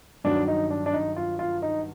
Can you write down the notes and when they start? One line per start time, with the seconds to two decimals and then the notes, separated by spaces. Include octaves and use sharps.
0.24 G2 D#3 F#3 D4
0.48 D#4
0.70 D4
0.86 D4
0.93 D#4
1.16 F4
1.39 F4
1.62 D#4